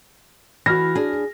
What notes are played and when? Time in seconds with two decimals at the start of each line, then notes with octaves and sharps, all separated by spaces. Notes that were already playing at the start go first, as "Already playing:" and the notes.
0.66 E3 F#4 F6 A#6
0.95 D4 G#4